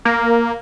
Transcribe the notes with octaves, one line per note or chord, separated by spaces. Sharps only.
A#3